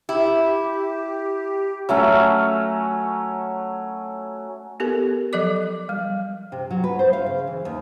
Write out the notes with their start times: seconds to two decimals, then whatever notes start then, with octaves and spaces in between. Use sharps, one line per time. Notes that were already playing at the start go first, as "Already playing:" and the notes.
0.09 E4 G4
1.89 F#3 A3 C#4
4.80 B3 G4 A4 A#4
5.33 F3 F#3 A4 D5 D6
5.89 G3
6.52 C3
6.71 F#3
6.84 B4
6.99 C5
7.13 F5
7.26 C#3
7.47 E3
7.65 D#2